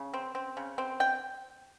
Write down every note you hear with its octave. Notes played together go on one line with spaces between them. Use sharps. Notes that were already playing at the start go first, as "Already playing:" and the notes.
Already playing: C#3
C4
C4
C#3
C4
G5